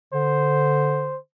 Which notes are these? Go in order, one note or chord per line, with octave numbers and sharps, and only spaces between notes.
D3 C5